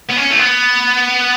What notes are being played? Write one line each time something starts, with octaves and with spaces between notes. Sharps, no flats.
B3
C#4
A3
B3